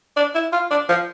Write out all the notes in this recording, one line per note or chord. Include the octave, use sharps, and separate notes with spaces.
D4
E4
F4
D4
F3